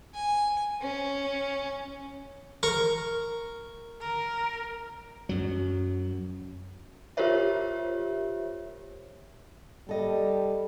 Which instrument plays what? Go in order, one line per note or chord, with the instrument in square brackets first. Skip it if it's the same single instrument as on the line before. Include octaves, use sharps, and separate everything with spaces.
[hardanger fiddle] G#5
C#4
[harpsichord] A#4 C#6
[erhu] A#4
[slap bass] F#2 F#3
[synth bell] F4 G4 A#4 C5 C#5 E5
[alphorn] G3 [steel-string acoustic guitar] A4 D#5